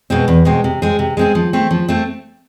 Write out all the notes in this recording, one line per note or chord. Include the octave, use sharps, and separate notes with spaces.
B2 G#3 C4
E2
B2 G#3 C4
C3
G#3 C4 G#4
C3
G#3 C4 G#4
F3
A3 C4
F3
A3 C4